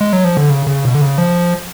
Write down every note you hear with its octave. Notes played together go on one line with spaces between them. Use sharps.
G#3
F#3
F3
D3
C#3
C#3
B2
D3
C#3
F3